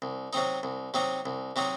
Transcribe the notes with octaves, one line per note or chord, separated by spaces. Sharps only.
C2
C3 F#3 C4 D#4
C2
C3 F#3 C4 D#4
C2
C3 F#3 C4 D#4